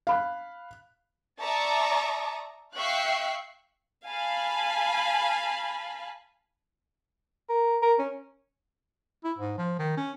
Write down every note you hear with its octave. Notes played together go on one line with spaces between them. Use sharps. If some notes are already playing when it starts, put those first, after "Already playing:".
F5 B5 F#6
D5 E5 A5 A#5 C#6 D#6
E5 F5 G5 C#6 F#6 C7
F5 G#5 A5 B5
A#4
A#4
C#4
E4
G#2
F3
D#3
C#4